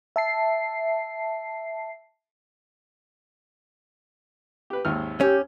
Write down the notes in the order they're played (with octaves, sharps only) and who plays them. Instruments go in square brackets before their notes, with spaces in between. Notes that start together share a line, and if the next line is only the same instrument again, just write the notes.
[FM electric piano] E5 A5 C7
[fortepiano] G4 B4
G#1 D#2 F6
[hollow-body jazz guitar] C#4 [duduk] G4